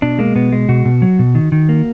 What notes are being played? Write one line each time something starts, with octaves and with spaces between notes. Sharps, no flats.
B2 D4
G#3 A#3
B2 B3
G#3
B2 F#4
B2
F#3
B2
D#3
D#3
A#3